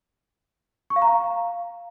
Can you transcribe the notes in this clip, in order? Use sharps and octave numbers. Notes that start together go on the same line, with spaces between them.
C#6
F5
A#5
F5